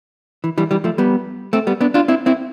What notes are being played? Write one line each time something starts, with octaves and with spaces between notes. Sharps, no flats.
E3
E3 G3
E3 G3
F3 A3
G3 B3
A3 C4
G3 B3
B3 D4
D4 F4
C4 E4
C4 E4